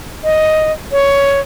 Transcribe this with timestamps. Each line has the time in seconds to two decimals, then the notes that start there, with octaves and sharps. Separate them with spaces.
0.24 D#5
0.92 C#5